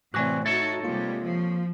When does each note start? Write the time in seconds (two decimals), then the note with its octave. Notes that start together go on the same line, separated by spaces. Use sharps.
0.14 A2 C3 E3 C4 F#4 D5 G#5 F#6
0.46 D#4 F#4 A4 C#5 E5 A5
0.84 C3 G3 G#3 A#3 F4
1.23 F3